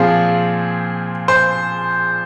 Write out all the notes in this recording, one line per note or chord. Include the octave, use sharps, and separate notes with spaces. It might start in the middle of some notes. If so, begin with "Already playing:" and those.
Already playing: A#2 F3 C4 G#4
C5